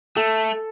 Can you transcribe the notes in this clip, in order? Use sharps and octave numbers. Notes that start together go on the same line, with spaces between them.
A3 A4